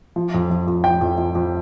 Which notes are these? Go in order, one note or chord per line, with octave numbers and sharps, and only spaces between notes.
F3
F2
F3
F2
F3 G5
F2
F3
F2